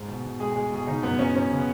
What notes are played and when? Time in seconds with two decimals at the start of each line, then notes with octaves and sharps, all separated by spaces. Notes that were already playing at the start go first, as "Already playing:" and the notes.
Already playing: G#2 G#3
0.08 B2
0.24 B2
0.40 G#3 G#4
0.52 G#3 G#4
0.72 B2 G#4
0.87 C#3 D#4
1.03 F#2 B3
1.19 F#3 C#4
1.35 F#2 C#4
1.51 C#3
1.58 B3